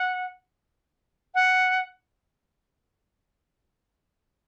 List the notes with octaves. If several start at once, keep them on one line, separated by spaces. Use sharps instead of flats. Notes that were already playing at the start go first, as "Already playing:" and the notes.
Already playing: F#5
F#5